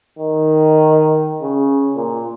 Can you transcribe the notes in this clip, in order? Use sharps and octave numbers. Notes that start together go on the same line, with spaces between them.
D#3
C#3
A#2